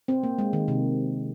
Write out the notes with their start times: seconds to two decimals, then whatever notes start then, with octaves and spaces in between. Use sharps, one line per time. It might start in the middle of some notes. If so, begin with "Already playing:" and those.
0.08 C4
0.23 A#3
0.38 G#3
0.53 D#3
0.68 C3